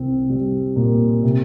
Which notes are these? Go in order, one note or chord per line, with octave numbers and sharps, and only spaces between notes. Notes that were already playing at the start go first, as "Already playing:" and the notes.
Already playing: C2 C4
G3
A#2
C3